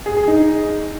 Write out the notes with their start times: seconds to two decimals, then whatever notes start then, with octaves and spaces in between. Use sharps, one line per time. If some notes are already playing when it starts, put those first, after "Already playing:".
0.06 G#4
0.17 G#4
0.28 D#4